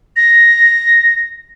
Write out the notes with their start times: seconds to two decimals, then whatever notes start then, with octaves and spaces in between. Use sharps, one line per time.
0.16 A#6